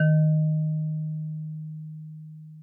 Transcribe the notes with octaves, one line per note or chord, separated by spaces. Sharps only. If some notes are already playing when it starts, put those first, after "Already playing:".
Already playing: D#3